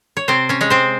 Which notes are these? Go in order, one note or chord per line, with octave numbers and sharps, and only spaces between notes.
C#5
C3 C4 C5
C#4 C#5
G#3 C#5
C4 C5